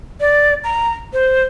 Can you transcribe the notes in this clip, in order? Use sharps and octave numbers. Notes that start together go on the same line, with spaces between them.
D5
A#5
C5